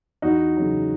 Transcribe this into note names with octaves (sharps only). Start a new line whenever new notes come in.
E2 D#4 F#4
C#3 F#3